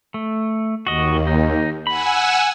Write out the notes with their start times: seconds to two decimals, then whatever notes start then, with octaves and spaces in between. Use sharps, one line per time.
0.14 A3
0.87 D#2 F#4 D#5
1.27 D#4
1.87 F#5 G#5 B5 E6